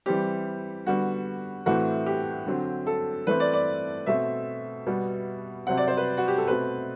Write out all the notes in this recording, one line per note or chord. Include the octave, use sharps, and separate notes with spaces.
E3 G3 C4 G4
D3 G3 B3 F#4
A2 E3 A3 C4 F#4
G4
D3 F#3 C4
A4
E3 A3 C4 B4
D5
D5
B2 A3 C4 E5
B2 G3 B3
C3 F#3 C4 F#5
D5
C5
B4
F#4
G4
A4
B2 A3 C4 B4